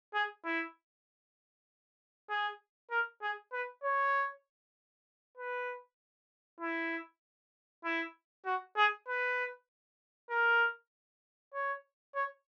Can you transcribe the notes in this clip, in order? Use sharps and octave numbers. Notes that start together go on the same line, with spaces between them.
G#4
E4
G#4
A#4
G#4
B4
C#5
B4
E4
E4
F#4
G#4
B4
A#4
C#5
C#5